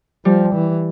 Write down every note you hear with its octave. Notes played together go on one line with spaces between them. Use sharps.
F3 G3
E3